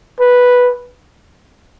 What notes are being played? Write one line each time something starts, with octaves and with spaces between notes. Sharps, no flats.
B4